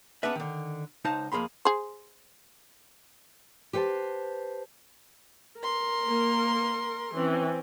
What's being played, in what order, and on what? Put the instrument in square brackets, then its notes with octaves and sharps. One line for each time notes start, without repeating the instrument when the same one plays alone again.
[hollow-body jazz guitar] B3 C#4 D4 G#4 B4 E5
D3 D#3
C#2 D#4 C5 D#5 F5 A5
F2 A#3 G#4 B5 C6
[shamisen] G#4 C5
[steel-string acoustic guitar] G4 B4 C5 F#5 A5
[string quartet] A#4 C6
[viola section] A#3
[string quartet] E3 [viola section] C4 C#4